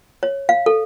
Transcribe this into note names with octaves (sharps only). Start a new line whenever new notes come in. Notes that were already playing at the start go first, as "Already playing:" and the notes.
C#5
F5
A4